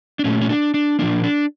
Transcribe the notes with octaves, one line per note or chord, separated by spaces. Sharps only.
D4
A#2 A3 C#4
C#4
D4
D4
A#2 F3 A#3 D4
D4